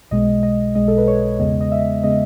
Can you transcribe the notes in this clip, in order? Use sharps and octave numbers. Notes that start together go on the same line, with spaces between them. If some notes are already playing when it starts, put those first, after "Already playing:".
B1 B2 G#3 D#5
D#5
B1 B2 G#3 D#5
A4
B4
C#5
E2 C#3 G#3 B3 D#5
D#5
E5
C#3 G#3 B3 D#5